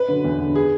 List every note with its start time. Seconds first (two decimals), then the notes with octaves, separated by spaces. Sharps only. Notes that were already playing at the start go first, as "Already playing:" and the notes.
Already playing: B4
0.08 D3 F#3
0.24 E2
0.40 D3 F#3
0.55 G#4